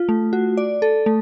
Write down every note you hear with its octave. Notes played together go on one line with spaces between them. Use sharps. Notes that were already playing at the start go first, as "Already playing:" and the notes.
Already playing: F4
A3
F#4
D5
A4
A3